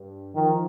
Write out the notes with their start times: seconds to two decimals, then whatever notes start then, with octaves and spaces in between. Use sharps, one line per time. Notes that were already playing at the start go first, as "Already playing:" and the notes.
Already playing: G2
0.35 D#3 F3